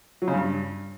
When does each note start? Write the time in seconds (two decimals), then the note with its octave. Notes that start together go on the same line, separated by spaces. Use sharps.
0.22 F#3
0.28 C#3
0.34 G2